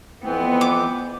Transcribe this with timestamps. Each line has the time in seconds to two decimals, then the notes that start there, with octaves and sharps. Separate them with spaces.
0.22 F2 E3 B3 C4
0.61 D6